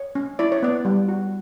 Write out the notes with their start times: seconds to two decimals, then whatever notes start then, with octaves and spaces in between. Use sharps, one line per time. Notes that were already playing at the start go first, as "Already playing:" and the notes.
Already playing: C#5
0.15 C#4
0.39 E4 D5
0.52 C#5
0.63 B3 D5
0.85 G3
1.09 F#4